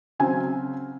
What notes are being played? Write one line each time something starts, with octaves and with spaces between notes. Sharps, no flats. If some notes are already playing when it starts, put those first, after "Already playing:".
C#3 F#3 C4 G#5